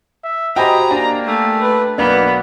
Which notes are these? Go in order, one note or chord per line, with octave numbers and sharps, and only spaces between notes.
E5
F#4 G4 C5 D#5 G5 G#5 A#5 B5
A#3 D4 D5 G#5
A3
B4
B1 A#3 B3 D4